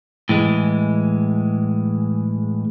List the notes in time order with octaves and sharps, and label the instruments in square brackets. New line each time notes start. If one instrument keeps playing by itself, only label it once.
[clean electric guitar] A2 E3 G#3